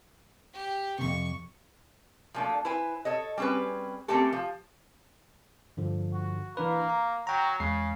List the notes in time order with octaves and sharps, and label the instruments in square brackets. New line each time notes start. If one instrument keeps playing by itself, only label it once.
[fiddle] G4
[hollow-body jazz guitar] F2 A2 C3 [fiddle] C#6
[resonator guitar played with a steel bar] F3 F#3 A3 A#3 D4
E4 B4 C5 G#5
A4 C#5 D#5
G3 C4 C#4 G#4 B4
A3 A#3 C4 C#4 G4 A4
F3
[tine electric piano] G2 D3 F3
[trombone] F#4
[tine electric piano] E3 D4 B4 [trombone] A#3
[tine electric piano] A#5
[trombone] F#3 [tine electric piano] G5 A#5
[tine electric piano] E2 G#3 C7 [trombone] C#3